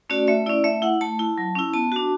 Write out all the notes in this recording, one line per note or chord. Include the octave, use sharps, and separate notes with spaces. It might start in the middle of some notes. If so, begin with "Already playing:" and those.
A3 C#4 F#4 D5
A3 E5
C#4 E4 D5
A3 E5
E4 F#5
A3 A5
E4
F#3
C#4 E4
B3 A5
D4 F#4